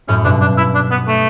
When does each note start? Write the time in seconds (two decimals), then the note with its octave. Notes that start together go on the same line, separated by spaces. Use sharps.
0.08 F#2 A2 C#4
0.24 G2 B2 D4
0.41 D4
0.57 E4
0.75 D4
0.91 B3
1.08 A3